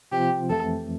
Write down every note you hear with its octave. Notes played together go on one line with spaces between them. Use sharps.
C3 F3 C4 F4 G4
F2 E3 A3 A4